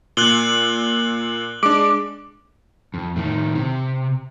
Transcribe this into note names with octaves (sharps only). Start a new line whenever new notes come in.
A#2 F#6 F#7 G7
G#3 D4 D6
F2
A2 D#3
C3